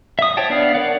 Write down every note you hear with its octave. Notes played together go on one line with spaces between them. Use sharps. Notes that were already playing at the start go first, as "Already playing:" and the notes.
E5 D#6
C5 C#5 E5 G5 A5
B3 D4 D5 E5 F5
A#4 C#5 D5 F5 F#5